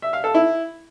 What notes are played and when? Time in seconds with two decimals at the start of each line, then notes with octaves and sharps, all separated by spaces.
0.02 E5
0.13 F5
0.24 A4
0.35 E4